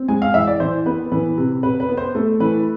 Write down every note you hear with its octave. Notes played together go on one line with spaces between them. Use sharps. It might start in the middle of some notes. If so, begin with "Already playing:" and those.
Already playing: C4
G#3 G#5
F5
E3 E5
D5
E3 C5
B3 B4
E3 B4
C3
C3 B4
B4
B3
C5
A3
E3 B4